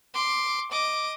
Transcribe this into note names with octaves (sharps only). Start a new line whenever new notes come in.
C6 D6
D#5 D6